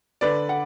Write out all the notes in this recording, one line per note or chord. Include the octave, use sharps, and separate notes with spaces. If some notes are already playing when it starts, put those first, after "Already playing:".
D3 B4 D5
F#5